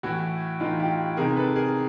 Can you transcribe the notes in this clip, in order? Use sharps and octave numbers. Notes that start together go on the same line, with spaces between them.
A2 E3 E4 F#4
A2 E3 D#4 F4
F4 G4
C3 D#3 G#4 A#4
A4 B4
G#4 A#4